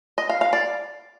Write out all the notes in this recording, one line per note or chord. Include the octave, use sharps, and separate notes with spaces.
D#5
F5
F5
D5